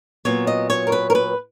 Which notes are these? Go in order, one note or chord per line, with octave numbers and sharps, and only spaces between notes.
A#2 F#3 B3 C#5
D#5
C#5
A#4
B4
A#4
B4